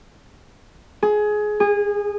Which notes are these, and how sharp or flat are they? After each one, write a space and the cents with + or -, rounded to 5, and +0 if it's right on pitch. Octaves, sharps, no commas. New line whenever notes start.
G#4 +20
G#4 -25